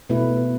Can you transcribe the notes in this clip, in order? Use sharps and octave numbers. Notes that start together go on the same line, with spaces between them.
B2 A3 E4 B4